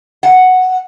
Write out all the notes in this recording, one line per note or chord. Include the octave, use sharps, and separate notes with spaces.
F#5